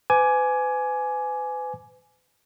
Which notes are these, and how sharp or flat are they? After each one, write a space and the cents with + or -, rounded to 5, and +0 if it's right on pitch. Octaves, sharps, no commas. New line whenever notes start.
B4 +40 G#5 +15 D6 +0